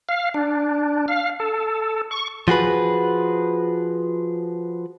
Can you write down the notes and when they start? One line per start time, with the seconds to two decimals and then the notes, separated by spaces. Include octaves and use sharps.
0.09 F5
0.34 D4
1.08 F5
1.40 A4
2.11 C#6
2.48 F3 F#4 G#4 B4